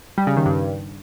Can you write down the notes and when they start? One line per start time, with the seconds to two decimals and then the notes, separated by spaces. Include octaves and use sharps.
0.18 G3
0.27 C#3
0.36 D#3
0.46 G2